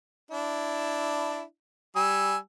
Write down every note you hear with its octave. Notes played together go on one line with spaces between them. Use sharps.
D4 E4
G3 G#5 E6